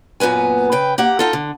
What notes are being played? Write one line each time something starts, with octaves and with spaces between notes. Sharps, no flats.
F#2 A#2 B3 B4 G#5
C#3 B4 G5
A#3 G4 F#5
D#4 F4 A4
D3